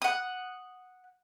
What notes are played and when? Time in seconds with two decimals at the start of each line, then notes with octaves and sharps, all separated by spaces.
0.02 F#5 D#6